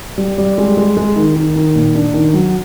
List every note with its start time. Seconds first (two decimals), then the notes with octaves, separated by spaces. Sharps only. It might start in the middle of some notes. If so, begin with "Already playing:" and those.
0.18 G3
0.38 G3
0.58 G#3
0.77 G#3
0.97 G#3
1.16 D#3
1.36 D#3
1.56 D#3
1.75 A#2
1.95 D4
2.14 D#3
2.34 F#3